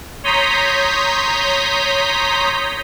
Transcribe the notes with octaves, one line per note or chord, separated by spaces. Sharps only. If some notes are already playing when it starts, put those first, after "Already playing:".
C#5 A#5 C6 D#6 G6 B6